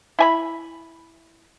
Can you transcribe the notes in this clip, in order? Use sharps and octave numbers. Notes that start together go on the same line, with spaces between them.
E4 G#5 B5